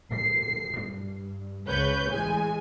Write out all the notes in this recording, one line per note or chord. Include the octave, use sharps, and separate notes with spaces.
C7
G2
C#2 C#3 B4 C#5 G6
A1 E3 G#3 G#5